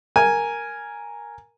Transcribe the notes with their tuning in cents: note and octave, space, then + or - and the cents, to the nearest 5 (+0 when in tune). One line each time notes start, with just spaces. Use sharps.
A#4 +0 G#5 +0